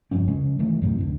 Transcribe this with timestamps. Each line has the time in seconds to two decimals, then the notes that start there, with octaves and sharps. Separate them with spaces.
0.11 F1 G2 F3 C#4
0.28 C#3 G#3 C#4
0.59 D#3 E3 A3
0.82 F#2 A2 C3
0.98 D1 D3